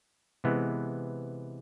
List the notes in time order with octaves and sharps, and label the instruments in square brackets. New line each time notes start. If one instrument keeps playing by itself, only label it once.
[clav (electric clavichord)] C3 E3 G#3 B3